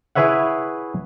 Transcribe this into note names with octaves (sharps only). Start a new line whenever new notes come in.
E4 G#4 B4 C#5 E5 F#5